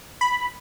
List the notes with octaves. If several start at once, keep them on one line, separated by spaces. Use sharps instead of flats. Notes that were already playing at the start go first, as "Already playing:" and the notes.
B5